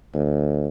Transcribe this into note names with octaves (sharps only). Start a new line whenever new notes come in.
D2